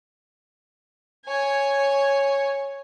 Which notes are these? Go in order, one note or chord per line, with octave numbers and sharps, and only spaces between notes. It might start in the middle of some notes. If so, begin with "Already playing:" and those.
C#5 G#5